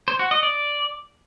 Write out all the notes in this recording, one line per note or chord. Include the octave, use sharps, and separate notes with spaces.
C5
F#4
D#5
D5